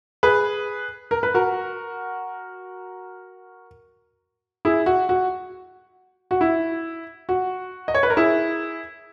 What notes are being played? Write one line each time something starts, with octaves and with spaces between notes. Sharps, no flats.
G#4 B4
A#4
B4
F#4 A#4
E4 G#4
F#4
F#4
F#4
E4
F#4
D#5
C#5
B4
A#4
E4 G#4